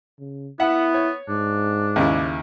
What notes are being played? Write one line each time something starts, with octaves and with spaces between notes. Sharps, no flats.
C#3
B3 E4 E5 F#5
C#5
G#2 D4
D#2 C#3 E4